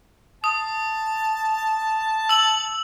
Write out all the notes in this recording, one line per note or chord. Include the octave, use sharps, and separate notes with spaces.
A5 D#6
E6 F#7